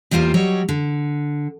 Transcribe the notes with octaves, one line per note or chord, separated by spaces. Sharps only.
E2 G3 A#3 F4 C5
F#3 G3 C#5 D#5
D3